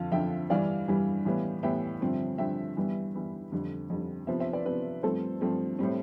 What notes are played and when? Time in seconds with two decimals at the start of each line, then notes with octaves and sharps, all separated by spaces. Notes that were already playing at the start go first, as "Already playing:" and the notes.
Already playing: F2 D3 F3 F5 A5
0.12 F2 D3 F3 E5 G5
0.50 G2 E3 G3 D5 F5
0.88 G2 E3 G3
1.25 A2 E3 G3 B3
1.63 A2 E3 G3 B3 E5 G5
2.01 G2 D3 F3 C4
2.38 G2 D3 F3 C4 E5 G5
2.77 G2 E3 G3 B3
3.14 G2 E3 G3 B3
3.52 F2 D3 G3
3.90 F2 D3 G3
4.27 C3 F3 B3 C5 E5
4.40 C5 E5
4.53 B4 D5
4.66 C3 F3 B3 B4
5.03 G2 F3 A3 C4 A4 C5
5.41 G2 F3 A3 C4
5.79 A2 G3 C4